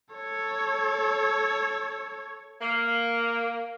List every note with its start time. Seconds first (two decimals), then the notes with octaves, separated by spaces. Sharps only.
0.15 A4 C#5
2.60 A#3